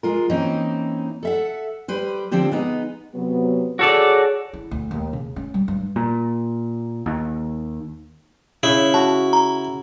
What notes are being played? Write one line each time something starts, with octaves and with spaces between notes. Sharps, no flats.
G#3 F4 A#4
E3 A#3 C4 C#4 D#4
A4 E5 F#5
G3 B4 C5
D3 F3 C4 D4 G4
G#3 B3 D#4
C3 F#3 B3
F#4 G#4 A4 C#5 D5
E4
D2
D#2
C#3
C#4
G3
G2
A#2
D#2
C#3 E4
F#4 A5
A#5